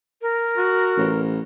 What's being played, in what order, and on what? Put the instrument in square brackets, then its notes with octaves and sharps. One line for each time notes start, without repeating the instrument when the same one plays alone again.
[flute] A#4
[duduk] F#4
[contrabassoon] A1